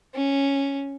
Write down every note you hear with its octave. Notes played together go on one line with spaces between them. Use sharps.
C#4